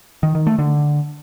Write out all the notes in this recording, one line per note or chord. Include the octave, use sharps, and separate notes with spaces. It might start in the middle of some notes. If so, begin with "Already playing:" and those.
D#3
D#3
A3
D3